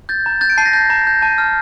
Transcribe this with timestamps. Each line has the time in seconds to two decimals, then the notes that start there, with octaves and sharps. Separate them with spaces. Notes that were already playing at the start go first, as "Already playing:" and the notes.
0.09 G6 A6
0.26 A#5
0.41 G6 A6
0.50 D7
0.58 A5 C7
0.66 A#6
0.73 G6
0.90 A#5
1.07 G6
1.22 A5
1.38 F6